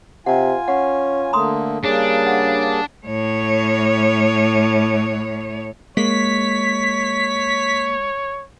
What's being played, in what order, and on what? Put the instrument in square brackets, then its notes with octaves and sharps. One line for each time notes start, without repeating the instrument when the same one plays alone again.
[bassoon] C3 [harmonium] F4 G#5 [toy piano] F#5
[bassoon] C#4 [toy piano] F#5
[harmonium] D3 A3 A#3 [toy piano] A#5 C6 D#6
[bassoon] C#3 [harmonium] G3 A#3 G#4 [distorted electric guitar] D4
[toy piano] F#5
[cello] A2 C#5
[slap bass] G#3 [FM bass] A#3 [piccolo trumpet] C#5 [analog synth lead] B6